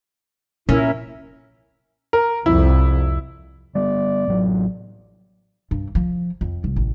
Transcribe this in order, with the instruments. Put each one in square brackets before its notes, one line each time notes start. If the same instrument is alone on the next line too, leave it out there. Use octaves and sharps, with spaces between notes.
[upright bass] A#2 [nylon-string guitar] C#4 [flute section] E4 A#4
[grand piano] A#4
[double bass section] C2 F2 [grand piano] E4
[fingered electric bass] G3 B3 [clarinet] D5
[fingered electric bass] A1 F#3
[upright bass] G2
F3
F2
C2
A1